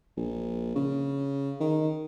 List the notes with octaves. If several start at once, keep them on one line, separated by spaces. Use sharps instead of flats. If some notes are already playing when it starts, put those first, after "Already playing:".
A#1
C#3
D#3